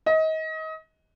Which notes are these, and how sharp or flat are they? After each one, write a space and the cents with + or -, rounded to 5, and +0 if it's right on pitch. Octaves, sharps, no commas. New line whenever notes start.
D#5 +30